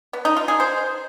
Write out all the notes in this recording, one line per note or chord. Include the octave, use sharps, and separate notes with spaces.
B3
D#4
F4
G#4
C5